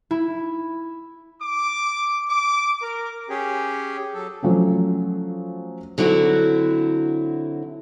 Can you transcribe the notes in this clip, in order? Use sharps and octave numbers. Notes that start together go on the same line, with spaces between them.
E4
D6
D6
A#4
C#4 G4 G#4
F#3 A4
F3 F#3 A3 C#4
D3 F#3 C4 E4 F#4